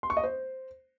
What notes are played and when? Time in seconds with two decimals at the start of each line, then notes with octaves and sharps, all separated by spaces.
0.03 C6
0.10 C#6
0.17 D#5
0.24 C5